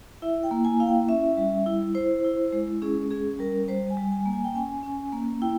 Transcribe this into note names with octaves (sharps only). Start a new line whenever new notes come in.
E4 E5
G5
A#3
G#5
E4 F5
G5
C#4 E5
G3
E4
E4 C5
E4
G#3
C#4 G#4
C#4 G#4
G3 A#4
G3 C5
G#5
G3
G#5
A#3
G#5
G5
C#4 G#5
C#4
A#3
E4 G5